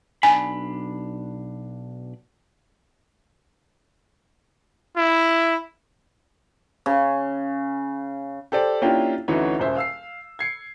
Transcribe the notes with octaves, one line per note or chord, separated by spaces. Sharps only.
B1 D4 G#5 B5
E4
C#3
G4 A4 C5 D5
A#3 C#4 D4 E4 F4 G4
D2 E3 C#4 D#4 F#4 C#5
D#1 C#2 C5 E5
F5 E6 C7
G#6 C7 C#7